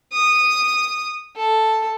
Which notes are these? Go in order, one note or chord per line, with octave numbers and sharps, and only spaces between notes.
D#6
A4